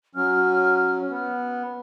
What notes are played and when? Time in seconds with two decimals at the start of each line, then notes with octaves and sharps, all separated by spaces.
0.15 F#3 C#4 F6
1.10 B3